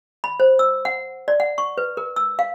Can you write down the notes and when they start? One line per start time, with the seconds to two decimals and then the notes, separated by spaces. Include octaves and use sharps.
0.24 B5
0.40 C5
0.59 E6
0.85 F#5
1.28 D5
1.40 F#5
1.58 C#6
1.78 B4
1.97 A#4
2.16 E6
2.39 F5